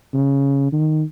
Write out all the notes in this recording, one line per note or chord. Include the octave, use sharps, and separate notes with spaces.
C#3
D#3